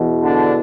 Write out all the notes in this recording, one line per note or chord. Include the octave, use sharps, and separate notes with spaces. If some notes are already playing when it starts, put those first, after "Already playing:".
Already playing: E2 B2
D3 D4